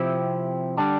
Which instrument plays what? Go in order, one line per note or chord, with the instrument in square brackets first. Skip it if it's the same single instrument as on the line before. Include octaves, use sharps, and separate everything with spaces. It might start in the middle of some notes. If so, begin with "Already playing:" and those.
Already playing: [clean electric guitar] C3 F3 C4 E4 G4
D3 G3 D4